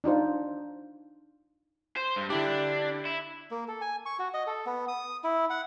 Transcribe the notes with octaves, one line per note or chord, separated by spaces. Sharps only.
D4 D#4 F4 C5
C5
G2
D3 D4 E4 G4
E4
A#3
A4
G#5
C#6
F#4
D#5
A4
B3
D#6
E4
F#5